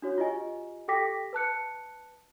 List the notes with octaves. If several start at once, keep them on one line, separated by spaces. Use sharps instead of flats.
D4 F#4 C#5
F4 G4 D#5 G#5
G4 A4 G5 D6 A#6 B6
B4 A5 F#6 C#7